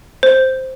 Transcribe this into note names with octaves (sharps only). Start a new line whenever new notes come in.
C5